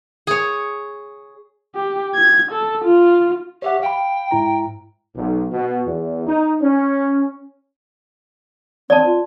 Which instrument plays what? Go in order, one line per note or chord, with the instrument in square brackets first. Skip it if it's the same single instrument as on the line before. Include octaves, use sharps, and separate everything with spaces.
[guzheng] G#4 C#5
[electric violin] G4
G#6
A4
F4
[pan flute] G4 [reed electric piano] C#5 E5 F#5
[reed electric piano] F5 B5 [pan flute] G5
[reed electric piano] G#2 E4 A#5
[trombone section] B1
B2
E2
D#4
C#4
[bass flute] C4 [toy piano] D5 A5
[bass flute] F4